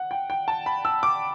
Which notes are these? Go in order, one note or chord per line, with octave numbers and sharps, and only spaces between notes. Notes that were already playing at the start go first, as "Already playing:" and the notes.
Already playing: F#5
G5
G5
A5
B5
E6
D6